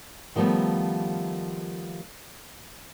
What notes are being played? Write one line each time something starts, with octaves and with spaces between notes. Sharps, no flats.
D#3 F3 G3 A3 B3